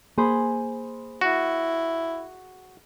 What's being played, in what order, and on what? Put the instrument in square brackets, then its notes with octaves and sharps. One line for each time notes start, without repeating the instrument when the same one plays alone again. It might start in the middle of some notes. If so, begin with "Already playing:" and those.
[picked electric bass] A#3 [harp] G#4 C5 B5
[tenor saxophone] E4 [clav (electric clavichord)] F#4